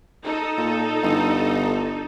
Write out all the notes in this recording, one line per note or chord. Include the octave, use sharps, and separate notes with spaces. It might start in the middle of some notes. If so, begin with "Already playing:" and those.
D#4 A4
A#2
G1